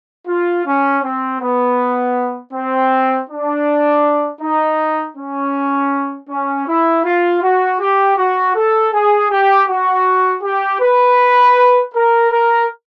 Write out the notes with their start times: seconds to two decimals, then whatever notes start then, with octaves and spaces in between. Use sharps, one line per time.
0.28 F4
0.65 C#4
1.03 C4
1.40 B3
2.53 C4
3.29 D4
4.41 D#4
5.17 C#4
6.29 C#4
6.67 E4
7.04 F4
7.43 F#4
7.80 G4
8.17 F#4
8.56 A4
8.93 G#4
9.31 G4
9.69 F#4
10.43 G4
10.81 B4
11.94 A#4
12.31 A#4